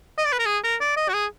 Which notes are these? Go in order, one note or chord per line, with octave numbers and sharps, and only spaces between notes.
D#5
D5
B4
A#4
G#4
A#4
D5
D#5
F#4
G#4